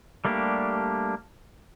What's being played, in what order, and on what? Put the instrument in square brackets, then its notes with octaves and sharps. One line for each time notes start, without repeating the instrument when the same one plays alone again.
[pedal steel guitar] G3 A3 A#3 D4 G4